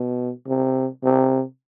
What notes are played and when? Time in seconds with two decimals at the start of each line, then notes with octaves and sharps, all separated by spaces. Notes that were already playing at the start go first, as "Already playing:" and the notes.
Already playing: B2
0.48 C3
1.04 C3